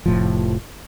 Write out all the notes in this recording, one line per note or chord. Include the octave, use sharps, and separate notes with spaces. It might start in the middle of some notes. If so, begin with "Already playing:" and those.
F1 A2 F3